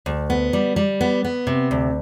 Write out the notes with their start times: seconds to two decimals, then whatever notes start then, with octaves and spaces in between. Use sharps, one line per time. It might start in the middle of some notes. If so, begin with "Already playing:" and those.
0.06 D2
0.30 B3
0.53 G3
0.76 G3
1.01 B3
1.24 B3
1.47 C3
1.71 D2